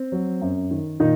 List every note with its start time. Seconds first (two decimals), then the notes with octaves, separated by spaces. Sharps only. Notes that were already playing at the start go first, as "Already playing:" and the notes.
Already playing: C4
0.12 F#3
0.41 F#2
0.71 D#3
1.00 A#2 D#3 D#4